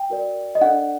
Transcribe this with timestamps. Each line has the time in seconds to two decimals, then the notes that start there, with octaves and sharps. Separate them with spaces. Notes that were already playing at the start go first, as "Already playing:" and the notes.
Already playing: G5
0.10 F#4 A#4 D5
0.55 D#5
0.61 D4 A4 D5 F#5